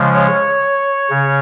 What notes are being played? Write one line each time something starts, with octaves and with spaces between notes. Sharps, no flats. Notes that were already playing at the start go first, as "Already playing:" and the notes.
Already playing: C#3 F3 G#3
C#5
C#3